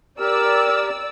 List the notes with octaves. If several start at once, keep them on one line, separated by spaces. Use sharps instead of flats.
G4 A#4 D5 E6